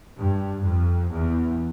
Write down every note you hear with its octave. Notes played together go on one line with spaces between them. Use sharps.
G2
F2
E2